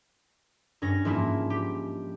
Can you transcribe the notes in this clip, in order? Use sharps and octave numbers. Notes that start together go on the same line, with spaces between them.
G2 C#4 A#6
G#2 F3 A#3 E4
G4